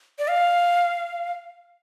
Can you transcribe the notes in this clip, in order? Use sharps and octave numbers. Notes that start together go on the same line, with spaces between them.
D5
F5